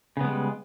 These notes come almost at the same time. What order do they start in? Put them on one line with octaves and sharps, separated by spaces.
C#3 B3 G#3 G3